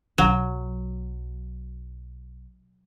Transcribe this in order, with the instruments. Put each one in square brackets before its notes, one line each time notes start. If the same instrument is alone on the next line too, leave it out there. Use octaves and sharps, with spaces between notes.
[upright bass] B1 [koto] F#3